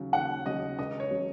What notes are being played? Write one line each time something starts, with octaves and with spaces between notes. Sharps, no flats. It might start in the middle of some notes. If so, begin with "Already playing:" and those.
Already playing: D#2 C#3 F#3
D#2 F#5
C#3 F#3 D#5
C#2 D#5
C#5
C#3 F#3